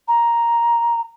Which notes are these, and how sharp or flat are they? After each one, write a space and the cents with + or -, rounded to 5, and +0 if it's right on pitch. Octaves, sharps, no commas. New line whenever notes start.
A#5 +5